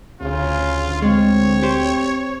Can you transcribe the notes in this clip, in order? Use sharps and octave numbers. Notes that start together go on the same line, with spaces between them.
D2 C#3 F4
G#3 C4 C#5
G4 C5